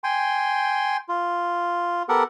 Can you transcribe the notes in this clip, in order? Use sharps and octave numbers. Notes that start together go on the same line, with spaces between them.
G5 G#5 C6
F4
B3 G4 A4 A#4 F#5